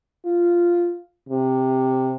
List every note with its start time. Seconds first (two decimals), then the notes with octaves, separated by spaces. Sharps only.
0.25 F4
1.29 C3